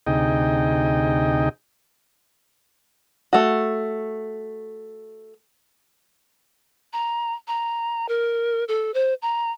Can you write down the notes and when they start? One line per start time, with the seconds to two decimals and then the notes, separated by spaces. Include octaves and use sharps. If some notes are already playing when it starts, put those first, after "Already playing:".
0.07 D2 C3 D#4 G#4 D#5 G5
3.33 A3 F#4
6.93 A#5
7.47 A#5
8.08 A#4
8.68 A4
8.94 C5
9.22 A#5